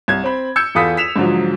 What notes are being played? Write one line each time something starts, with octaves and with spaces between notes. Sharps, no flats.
C2 G#6
C4 B5
E6 G6 G#6 C#7
E2 F4 A4 B5 D#6 B6
B6 E7 F7
G#2 D3 F3 F#3